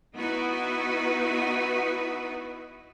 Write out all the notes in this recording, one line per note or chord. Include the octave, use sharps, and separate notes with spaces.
B3 D#4 E4 F#4 B4